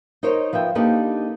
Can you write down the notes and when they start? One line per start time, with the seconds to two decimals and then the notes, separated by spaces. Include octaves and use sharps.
0.23 D#4 A#4 C5 C#5 D#5
0.53 F3 B4 E5 G5
0.75 A#3 D4 D#4 G4 A4 B4